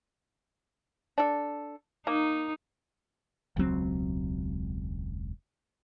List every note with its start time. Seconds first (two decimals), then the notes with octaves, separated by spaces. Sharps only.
1.18 D4 A4
2.07 A#3 D#4
3.57 E1 C#2 F#3 C4